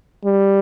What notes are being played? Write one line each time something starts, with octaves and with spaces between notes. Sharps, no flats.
G3